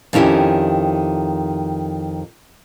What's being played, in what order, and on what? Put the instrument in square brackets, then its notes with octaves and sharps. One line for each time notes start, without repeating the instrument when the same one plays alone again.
[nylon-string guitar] F2 D#3 C#4 E4 G4